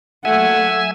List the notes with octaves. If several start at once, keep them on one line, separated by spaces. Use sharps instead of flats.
F#3 A3 A#3 E5 F#5 G#5